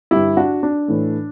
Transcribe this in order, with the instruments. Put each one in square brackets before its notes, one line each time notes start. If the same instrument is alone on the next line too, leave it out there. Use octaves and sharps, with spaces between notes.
[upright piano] G2 D3 G3 E4 G4
D4 F#4
D4
A2 E3 A3